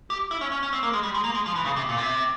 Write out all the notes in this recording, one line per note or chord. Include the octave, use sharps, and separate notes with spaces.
G4
E4
C#4
C#4
C#4
C4
A#3
G#3
G3
G#3
A#3
G#3
F3
E3
C#3
C3
A#2
C3